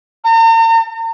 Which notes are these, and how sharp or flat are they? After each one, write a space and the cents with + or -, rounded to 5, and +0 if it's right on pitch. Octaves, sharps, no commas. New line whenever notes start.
A#5 -45